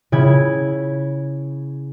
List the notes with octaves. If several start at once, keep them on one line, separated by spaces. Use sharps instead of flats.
C#3 E4 G#6